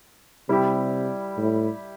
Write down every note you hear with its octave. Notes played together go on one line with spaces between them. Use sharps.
C3 G3 E4 G4
A2